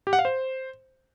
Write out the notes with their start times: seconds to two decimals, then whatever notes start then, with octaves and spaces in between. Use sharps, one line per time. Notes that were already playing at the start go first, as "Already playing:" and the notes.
0.07 G4
0.13 F#5
0.19 F5
0.25 C5